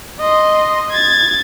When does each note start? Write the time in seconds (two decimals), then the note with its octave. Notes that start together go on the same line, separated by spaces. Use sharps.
0.19 D#5 C6
0.91 G#6 A6